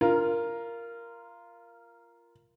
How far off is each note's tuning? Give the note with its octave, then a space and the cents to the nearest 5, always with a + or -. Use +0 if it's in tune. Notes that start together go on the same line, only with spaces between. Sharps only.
F4 -15 A#4 +0